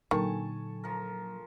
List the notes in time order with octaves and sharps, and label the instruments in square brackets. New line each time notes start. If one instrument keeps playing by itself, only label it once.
[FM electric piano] A#2 D3 A4 [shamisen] D#3 [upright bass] F#3 [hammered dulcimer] G#5 A5 C#6
[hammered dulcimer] F3 A#4